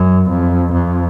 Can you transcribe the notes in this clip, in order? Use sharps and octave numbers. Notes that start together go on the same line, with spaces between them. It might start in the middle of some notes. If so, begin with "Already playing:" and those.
Already playing: F#2
F2
F2